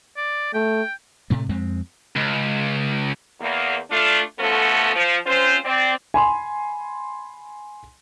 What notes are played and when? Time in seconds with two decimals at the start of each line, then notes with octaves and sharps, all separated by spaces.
0.17 D5
0.54 A3 G5
1.30 A2 C3 A3
1.49 F2 G#3 C4
2.16 C#2
3.40 E2 A#3
3.91 A3 D4 F4
4.39 F3 A3 B3 C#4 F#4 A4
4.95 F3
5.27 C4 C#4 F4 C5
5.65 C4 D5
6.14 G#5 B5 C6